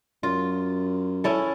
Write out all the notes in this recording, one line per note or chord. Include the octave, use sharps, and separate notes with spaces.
F#2 F4
C#4 E4 A4